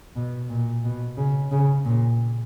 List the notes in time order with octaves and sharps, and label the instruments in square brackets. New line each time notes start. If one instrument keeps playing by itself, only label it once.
[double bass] B2
A#2
B2
C#3
C#3
A#2